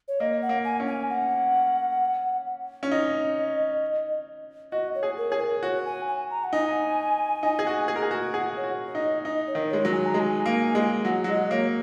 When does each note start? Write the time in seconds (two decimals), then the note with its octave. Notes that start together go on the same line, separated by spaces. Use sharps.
0.08 C#5
0.20 A#3 D#5
0.42 F#5
0.49 A#3
0.64 G#5
0.80 C#4
0.87 G#5
1.10 F#5
2.83 C#4
2.91 D#4 D#5
4.72 F#4 D#5
4.95 C#5
5.03 G#4
5.18 A#4
5.30 G#4 C#5
5.40 A#4
5.63 F#4 C#5
5.85 G#5
6.08 G#5
6.30 A#5
6.44 F#5
6.53 D#4 G#5
7.43 D#4
7.59 G#4
7.67 F#4
7.88 G#4
7.96 A#4
8.03 G#4
8.11 F#4
8.33 G#4 F#5
8.57 C#5
8.64 F#4
8.95 D#4
9.02 D#5
9.24 D#4 D#5
9.47 C#5
9.55 D#3
9.69 G#3 C#5
9.85 F#3
9.92 G#5
10.06 A#5
10.14 G#3
10.20 G#5
10.46 A#3
10.75 G#3
11.05 F#3 F#5
11.24 F#3
11.28 G#3 D#5
11.51 A#3 C#5